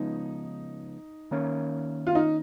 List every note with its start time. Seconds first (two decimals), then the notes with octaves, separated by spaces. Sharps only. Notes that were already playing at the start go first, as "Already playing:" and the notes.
Already playing: C#3 F3 G#3 B3 D#4
1.31 D#3 A#3 C#4
2.07 F4
2.15 D#4